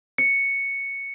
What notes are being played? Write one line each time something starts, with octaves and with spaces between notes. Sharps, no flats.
C#7